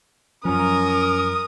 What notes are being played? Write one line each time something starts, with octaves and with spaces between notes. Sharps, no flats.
F#2 F3 C#4 A#4 D#6